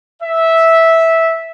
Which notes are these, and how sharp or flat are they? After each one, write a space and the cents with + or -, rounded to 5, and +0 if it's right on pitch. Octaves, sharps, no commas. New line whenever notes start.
E5 -10